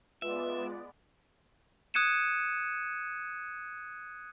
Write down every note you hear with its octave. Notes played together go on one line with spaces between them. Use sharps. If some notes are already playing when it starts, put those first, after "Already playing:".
G#3 B3 F4 B4 D5 E5
D#6 F#6 G#6 C#7 D#7 E7